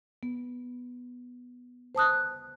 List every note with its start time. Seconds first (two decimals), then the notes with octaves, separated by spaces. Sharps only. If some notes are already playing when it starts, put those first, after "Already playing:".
0.23 B3
1.95 C5 A5 D#6 F#6